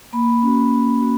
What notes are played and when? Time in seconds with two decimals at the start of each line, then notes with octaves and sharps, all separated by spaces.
0.13 A#3 B5
0.42 C#4 F#4
0.72 A#3
1.01 F#4